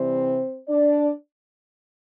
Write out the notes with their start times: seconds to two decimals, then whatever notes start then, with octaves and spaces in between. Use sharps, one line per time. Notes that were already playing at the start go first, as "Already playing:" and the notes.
Already playing: C3 E3 G3 C4 C5
0.68 D4 D5